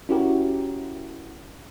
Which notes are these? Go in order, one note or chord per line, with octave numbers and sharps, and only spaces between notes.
C#4 E4 F#4 G4 A#4